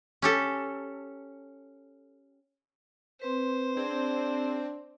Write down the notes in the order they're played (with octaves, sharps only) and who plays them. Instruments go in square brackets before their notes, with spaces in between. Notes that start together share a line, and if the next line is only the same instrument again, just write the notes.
[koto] C#4 G4 A4
[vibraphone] C4 B4 [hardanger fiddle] C5
[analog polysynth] C4 [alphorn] D4 [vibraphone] G#4